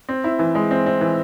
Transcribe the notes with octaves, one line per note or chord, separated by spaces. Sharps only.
C4
E4
E3
G#3
C4
C4
E3